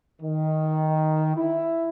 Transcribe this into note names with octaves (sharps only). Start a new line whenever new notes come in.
D#3
E4